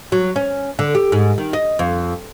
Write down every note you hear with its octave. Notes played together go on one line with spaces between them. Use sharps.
F#3
C#4
D3
G4
G#2
D#3
D#5
F2